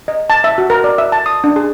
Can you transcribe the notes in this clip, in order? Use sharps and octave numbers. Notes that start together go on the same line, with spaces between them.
D#5
A5
E5
F#4
A#4
D5
E5
A5
D#6
D4
G#4